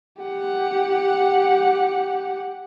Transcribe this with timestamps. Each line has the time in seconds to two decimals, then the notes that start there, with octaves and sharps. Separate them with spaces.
0.22 G4 F#5